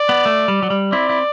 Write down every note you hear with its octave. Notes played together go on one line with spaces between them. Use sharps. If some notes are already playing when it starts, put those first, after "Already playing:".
Already playing: D5
B3
A3
G3
F#3
G3
C4 E4 D5
E4